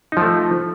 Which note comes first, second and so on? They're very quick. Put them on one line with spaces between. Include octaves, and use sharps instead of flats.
D#4 F3 A3